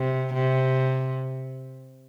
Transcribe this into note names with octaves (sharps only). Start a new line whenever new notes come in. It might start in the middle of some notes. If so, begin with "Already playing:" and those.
Already playing: C3
C3